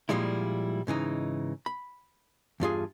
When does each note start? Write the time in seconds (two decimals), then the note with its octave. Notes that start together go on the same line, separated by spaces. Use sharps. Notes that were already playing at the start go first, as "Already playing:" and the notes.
0.09 A#2 D3 F3 G3 G#3 E4
0.87 G#2 C#3 E3 D#4
1.66 B5
2.60 E2 G2 F4 G#4